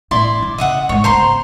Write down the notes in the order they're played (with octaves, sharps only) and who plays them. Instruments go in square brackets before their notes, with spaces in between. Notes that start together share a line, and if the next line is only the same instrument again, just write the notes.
[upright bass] A2 [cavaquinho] E4 D5 C6
[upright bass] D3 D4
[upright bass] C#3 [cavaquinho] D#5 E5 F#5
[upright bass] G#2 G#3 [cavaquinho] C#5
[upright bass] C#3 B3 [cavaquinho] C5 A#5 C6